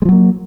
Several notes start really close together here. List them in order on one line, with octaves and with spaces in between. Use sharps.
G#3 F3 F#3 A#3